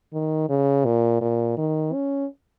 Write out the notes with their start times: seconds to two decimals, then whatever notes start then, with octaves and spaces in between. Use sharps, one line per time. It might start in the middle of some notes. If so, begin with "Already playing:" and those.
0.13 D#3
0.49 C#3
0.85 A#2
1.21 A#2
1.58 D#3
1.93 C#4